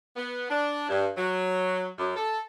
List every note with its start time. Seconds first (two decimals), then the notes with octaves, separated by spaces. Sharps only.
0.16 B3
0.50 D4
0.89 G2
1.17 F#3
1.98 F#2
2.16 A4